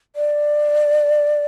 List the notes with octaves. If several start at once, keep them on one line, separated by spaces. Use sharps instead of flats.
D5